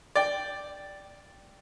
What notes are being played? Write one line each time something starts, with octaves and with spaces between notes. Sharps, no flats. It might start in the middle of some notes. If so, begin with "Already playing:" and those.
D5 G5